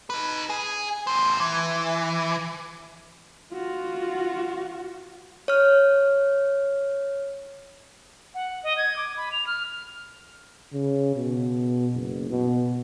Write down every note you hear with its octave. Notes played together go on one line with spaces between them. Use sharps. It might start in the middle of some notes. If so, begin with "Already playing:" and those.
D#4 B4
G#4
A2 C5
E3
F4 F#4
C#5 F6
F#5
D#5
G#6
D6
B5
F7
F6
C#3
B2
F#1
B2